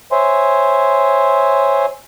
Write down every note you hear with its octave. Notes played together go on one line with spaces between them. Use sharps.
C5 C#5 E5 G#5 C6